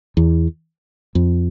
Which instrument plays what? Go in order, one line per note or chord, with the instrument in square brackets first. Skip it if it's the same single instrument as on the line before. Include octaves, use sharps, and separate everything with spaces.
[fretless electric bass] E2
F2